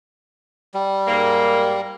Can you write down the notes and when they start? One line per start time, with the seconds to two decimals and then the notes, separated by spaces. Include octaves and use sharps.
0.74 G3
1.07 G#2 A#3